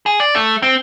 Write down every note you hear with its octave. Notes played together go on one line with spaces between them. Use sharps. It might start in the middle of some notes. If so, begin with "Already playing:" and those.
G#4
D5
A3
C4